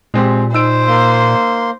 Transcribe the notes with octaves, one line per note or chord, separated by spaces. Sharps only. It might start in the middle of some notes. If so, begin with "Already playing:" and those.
A#2 G#3 C4 G4
D#4 C5 E6 D7
A#3 C6